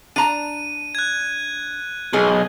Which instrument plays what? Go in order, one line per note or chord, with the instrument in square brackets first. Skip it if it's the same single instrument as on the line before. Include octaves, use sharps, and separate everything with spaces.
[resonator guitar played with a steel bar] D4 A#5 [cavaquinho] A5 [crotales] D#7
[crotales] F#6 G#6
[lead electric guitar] B1 [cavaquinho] G#4 D#5